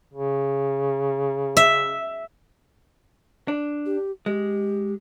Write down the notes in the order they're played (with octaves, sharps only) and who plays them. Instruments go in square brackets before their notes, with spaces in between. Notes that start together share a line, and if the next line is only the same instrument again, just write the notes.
[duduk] C#3
[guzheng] E5
[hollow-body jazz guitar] D4
[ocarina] G4
[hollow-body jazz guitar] G#3 [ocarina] G4